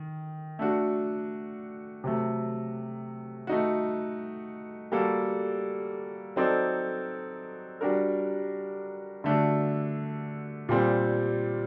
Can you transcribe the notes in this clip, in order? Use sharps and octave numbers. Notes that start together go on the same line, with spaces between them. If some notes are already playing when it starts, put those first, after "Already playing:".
Already playing: D#3
A3 D4 F#4
C3 F#3 A3
A3 D#4 F#4
G3 A#3 F#4 A4
F#3 C4 D#4 A4 D5
G3 D4 F#4 A#4
D3 A3 D4 F#4
A#2 G3 C4